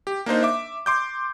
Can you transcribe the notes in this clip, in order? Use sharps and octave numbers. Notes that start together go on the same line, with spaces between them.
G4
A#3 D4 D#4 C5
E5 D6
C6 D6 G6